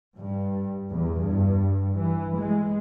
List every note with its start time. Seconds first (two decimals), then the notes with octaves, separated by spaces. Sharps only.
0.17 G2
0.90 E2
1.20 G2
1.96 E3
2.37 G#3